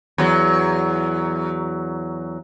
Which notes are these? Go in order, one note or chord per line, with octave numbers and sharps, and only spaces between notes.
E2 F#3